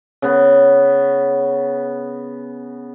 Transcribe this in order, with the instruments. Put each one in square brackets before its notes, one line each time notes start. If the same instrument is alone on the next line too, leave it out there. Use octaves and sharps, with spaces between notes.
[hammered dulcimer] C#3 B3